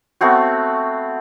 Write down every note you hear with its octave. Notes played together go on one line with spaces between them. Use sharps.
A3 B3 C4 F#4